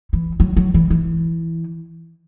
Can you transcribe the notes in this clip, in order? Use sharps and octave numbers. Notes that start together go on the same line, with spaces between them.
E3
F#3
F#3
E3
E3